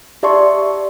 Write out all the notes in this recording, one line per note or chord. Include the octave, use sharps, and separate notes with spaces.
G4 D5 E5 A5 C6 C#6